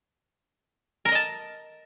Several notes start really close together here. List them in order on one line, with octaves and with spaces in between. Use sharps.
A#4 A#5 D#5 A5